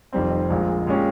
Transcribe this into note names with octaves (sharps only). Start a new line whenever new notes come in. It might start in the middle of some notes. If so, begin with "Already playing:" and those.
F1 F2 D#3 G3 C4
A#1 A#2 G#3
A#2 G#3 C#4 G4